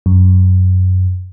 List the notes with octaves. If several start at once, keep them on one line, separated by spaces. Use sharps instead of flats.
F#2